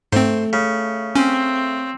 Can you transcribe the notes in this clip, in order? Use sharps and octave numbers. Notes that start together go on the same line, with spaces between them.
G#2 A3 C4 C5
C#3
C4 C#4